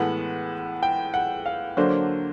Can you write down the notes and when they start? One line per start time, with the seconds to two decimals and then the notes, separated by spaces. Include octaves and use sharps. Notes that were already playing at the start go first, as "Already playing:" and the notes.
Already playing: A2 E3 G#3 B3 F#5
0.83 G5
1.14 F#5
1.46 F5
1.77 D3 F#3 A#3 D4 C5